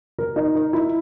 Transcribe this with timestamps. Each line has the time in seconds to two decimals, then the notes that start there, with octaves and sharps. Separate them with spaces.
0.19 A#4
0.36 D#4
0.55 A#4
0.73 E4